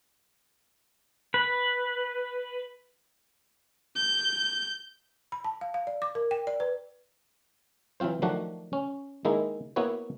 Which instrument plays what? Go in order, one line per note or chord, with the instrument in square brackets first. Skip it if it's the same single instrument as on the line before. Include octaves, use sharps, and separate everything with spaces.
[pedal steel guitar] B4
[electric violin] G6
[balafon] B5
A5
F5
F5
D5
D6
A#4
G5
D5
B4
[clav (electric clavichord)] E3 F#3 C4 F4 C5
D#3 F3 F#3 A3 D4 F#4
C#4
D#3 G#3 A#3 D#4 E4
A#3 B3 E4 F#4 B4 C#5